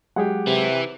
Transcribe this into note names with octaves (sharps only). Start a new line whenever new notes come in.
F#3 G#3 G4 G#4 F#5
C3 E3